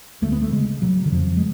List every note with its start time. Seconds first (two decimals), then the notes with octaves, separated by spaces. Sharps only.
0.22 D2 A3
0.32 B3
0.42 A3
0.52 C#3 G#3
0.82 C#3 F#3
1.06 D3
1.12 F2 F3
1.37 G#3